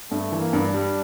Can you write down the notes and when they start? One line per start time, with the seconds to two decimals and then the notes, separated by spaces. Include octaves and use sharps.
0.11 G2 A3
0.32 E3
0.39 A#3
0.53 G2
0.67 D4
0.74 G3